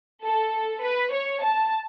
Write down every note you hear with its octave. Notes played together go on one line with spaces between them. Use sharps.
A4
B4
C#5
A5